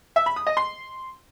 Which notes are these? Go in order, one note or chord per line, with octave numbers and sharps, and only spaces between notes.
E5
B5
D#6
D#5
C6